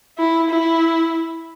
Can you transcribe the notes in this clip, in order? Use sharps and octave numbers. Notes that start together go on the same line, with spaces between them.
E4
E4